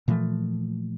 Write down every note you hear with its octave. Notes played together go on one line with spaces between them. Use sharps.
A#2 E3 F3 A3